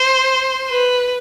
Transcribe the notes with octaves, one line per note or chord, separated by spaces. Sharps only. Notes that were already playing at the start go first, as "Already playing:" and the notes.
Already playing: C5
B4